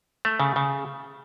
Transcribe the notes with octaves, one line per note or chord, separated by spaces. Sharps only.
A3
C#3
C#3